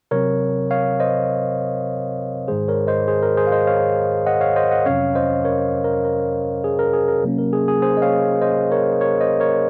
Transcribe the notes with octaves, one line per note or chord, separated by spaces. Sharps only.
C3 F#3 C4 A#4 C#5
C#5 F5
C5 D#5
G#2 D#3 G#3 G#4 C5
A#4 C#5
C5 D#5
G#4 C5
A#4
G#4 C5
F5
C5 D#5
C#5 F5
D#5 F#5
C#5 F5
C5 D#5
D#5 F#5
F2 C3 F#3 C#4 C#5 F5
C5 D#5
A#4 C#5
A#4
A#4
G#4
A#4
G#4
A#4
C3 F#3 A#3 C#4
A#4
G#4
G#4
G#4 C5
D#5
C#5 F5
C5 D#5
A#4 C#5
A#4 C#5
C5 D#5
A#4 C#5